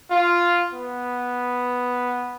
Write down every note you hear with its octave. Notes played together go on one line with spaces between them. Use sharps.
F4
B3